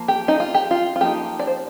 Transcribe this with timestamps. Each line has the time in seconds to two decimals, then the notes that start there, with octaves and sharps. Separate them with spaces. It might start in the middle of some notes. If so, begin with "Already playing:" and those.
Already playing: F3 A#3
0.08 G4
0.28 D#4
0.40 F4
0.54 G4
0.71 F4
0.96 F4
1.01 F3 A#3 D#4 G4
1.39 D5
1.47 C5